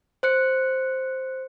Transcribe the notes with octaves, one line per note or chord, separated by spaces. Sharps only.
C5 F#6 C#7